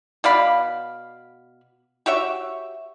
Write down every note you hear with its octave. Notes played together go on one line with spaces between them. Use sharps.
B2 D5 F5 B5
F#4 G4 C#5 E5